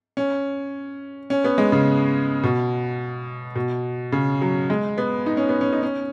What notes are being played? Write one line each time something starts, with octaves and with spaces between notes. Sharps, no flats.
C#4
C#4
B3
G#3
C#3
B2
B2
C#3
F#3
G#3
B3
D#4
C#4
B3
C#4
D#4
C#4